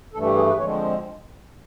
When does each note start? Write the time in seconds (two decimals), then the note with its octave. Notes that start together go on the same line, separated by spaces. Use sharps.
0.14 G2 E3 A3 A4
0.25 G4
0.37 G#4
0.48 B4
0.59 D3 F3 G#3 C4 C#5